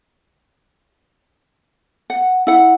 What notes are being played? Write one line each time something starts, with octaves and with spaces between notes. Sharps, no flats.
F#5
E4 F#5